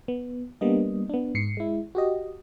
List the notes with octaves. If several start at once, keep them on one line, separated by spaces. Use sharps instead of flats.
B3
G3 A#3 B3 D4 D#5
B3 D4
G#2 C7 C#7
G#3 E4
F#4 G4 D#5